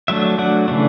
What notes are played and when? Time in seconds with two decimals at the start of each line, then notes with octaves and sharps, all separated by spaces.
0.08 F#3 A3 D4 E5
0.38 F#3 A3 D4 F#5
0.68 C#3 E3 A3 D4